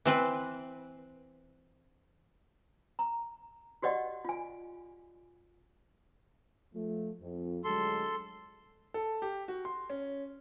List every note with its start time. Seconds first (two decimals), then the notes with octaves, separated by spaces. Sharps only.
0.05 E3 C4 B4
2.99 A#5
3.82 F#4 G4 D5 D#5 F#5
4.25 F4 G#5
6.74 F3 A3
7.21 F2
7.64 D2 F#3 G#3 A4 C6
8.94 A4
9.22 G4
9.48 F#4
9.65 C6
9.90 C#4